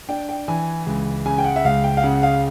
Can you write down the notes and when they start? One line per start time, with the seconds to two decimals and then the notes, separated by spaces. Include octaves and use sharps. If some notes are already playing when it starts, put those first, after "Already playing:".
0.09 D4 G5
0.29 G5
0.48 E3 G#5
0.86 C#2
1.26 C#3 G#5
1.38 G5
1.44 F#5
1.56 E5
1.65 C#2 F5
1.84 G5
1.97 F5
2.03 C#3 F#5
2.23 F5